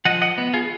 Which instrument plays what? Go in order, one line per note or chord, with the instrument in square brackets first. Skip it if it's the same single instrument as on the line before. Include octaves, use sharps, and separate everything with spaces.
[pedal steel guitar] F3 D#5 F#5
D#5 F#5
B3
F4 G#4